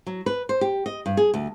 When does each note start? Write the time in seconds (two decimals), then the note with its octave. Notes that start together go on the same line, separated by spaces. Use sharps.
0.07 F#3
0.26 B4
0.49 C5
0.61 G4
0.86 D#5
1.06 G2
1.17 G#4
1.34 D2